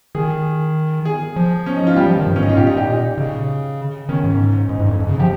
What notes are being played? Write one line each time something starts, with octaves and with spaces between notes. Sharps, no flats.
D#3 G#4
G#4
F3
C#4
D#4
F4
G3 G4
F3
D#3
G2
C#4
G#2 D#4
F4
A#2 G4
D#4
G4
D#4
C#3
D#3 C#4
G#2
G#2 D#4
G2
F2
F2
C#3
F3 G4